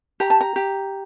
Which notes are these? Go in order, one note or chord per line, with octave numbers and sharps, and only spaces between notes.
G4 A#5
A5
A#5
G4